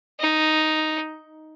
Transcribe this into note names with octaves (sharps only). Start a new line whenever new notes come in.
D#4